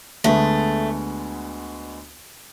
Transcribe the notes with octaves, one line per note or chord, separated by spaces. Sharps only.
D2 D3 G#3 A3 B3